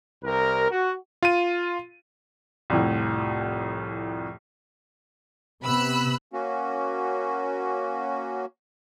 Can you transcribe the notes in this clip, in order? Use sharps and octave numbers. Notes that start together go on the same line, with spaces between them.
C2 A#4
F#4
F4 D#7
C2 F2 A2
C3 B3 B5 E6 F#6
A#3 C#4 F#4